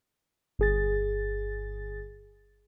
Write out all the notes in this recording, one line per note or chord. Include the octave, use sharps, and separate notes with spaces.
G1 G#4 A6